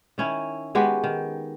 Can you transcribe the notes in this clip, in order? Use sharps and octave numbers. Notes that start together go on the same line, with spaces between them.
D#3 C#4 E4
G#3 B3 F#4 G4
D#3